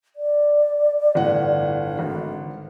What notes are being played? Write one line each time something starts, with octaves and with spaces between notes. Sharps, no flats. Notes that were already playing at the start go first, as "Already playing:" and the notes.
D5
G1 A2 F#5
D3
G#1